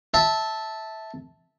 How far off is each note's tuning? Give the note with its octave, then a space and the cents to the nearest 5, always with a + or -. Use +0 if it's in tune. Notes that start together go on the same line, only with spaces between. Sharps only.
E5 -15 A5 +0